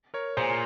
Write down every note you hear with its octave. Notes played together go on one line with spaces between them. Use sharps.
A#4 C#5
A#2 G#4 C5